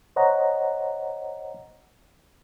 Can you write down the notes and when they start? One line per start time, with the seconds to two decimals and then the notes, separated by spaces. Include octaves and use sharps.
0.16 C5 C#5 D#5 F#5 A#5